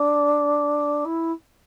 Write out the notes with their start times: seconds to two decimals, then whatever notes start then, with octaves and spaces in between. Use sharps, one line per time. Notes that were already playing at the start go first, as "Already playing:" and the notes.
Already playing: D4
1.05 E4